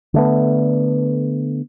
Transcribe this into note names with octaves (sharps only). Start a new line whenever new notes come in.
D3 A3 B3